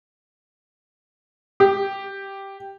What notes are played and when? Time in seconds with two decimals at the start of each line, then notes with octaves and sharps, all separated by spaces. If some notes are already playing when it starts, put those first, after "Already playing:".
1.60 G4